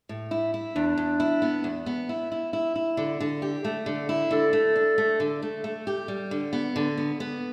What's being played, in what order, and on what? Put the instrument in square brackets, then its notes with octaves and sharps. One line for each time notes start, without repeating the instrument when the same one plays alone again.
[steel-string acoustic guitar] A2
E4
E4
[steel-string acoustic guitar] E2 [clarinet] D4
[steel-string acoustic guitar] E2
E4
B3
E2
B3
E4
E4
E4
E4
D3
D3
G4
A3
D3
E4
[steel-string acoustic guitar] D3 [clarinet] A4
[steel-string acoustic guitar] A3
D4
A3
D3
A3
A3
G4
G3
D3
B3
D3
B3
B3